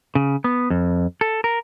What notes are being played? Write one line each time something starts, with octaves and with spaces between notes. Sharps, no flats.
C#3
B3
F2
A4
A#4